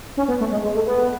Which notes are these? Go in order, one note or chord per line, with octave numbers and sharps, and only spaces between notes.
C#4
B3
A3
G#3
G#3
A3
B3